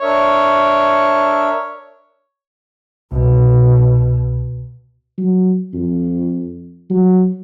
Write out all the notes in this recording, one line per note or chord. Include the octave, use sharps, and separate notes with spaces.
D4 A#4 C#5 E5
C2 B2
F#3
F2
F#3